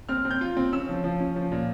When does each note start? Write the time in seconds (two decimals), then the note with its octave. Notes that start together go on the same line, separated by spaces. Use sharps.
0.09 C4 F6
0.25 C4
0.31 G6
0.41 F4
0.57 C4
0.72 C#4 E6
0.89 F3
1.04 F3
1.20 C#4
1.36 F3
1.52 A#2